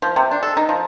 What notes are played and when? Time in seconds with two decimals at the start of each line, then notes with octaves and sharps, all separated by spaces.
0.02 F3
0.16 C3
0.31 D4
0.43 A4
0.57 D#4
0.69 F3